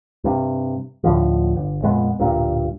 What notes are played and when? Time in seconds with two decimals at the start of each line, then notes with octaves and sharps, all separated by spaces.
0.24 G2 C3
1.04 D2 A2 D3 F3
1.56 G1
1.82 F2 A#2 G#3 B3
2.19 D1 G2 A#2 A#3